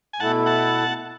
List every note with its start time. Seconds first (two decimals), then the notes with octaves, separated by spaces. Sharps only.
0.13 G#5
0.20 B2 A3 E4 A4 F#5 A5
0.46 F#5 A5